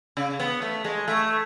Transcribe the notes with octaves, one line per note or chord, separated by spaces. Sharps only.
C#3
B3
A3
G#3
A3